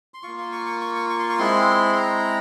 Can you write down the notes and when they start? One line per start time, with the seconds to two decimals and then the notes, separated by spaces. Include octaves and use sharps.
0.14 C6
0.23 A#3 F4 C#6
0.38 C6
0.52 C#6
0.66 C#6
0.81 C#6
0.96 C#6
1.10 C#6
1.19 C6
1.29 C#6
1.38 G#3 C4 E4 C6
1.93 C6
1.97 A#5